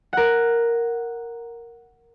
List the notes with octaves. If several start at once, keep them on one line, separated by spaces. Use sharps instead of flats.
A#4 F#5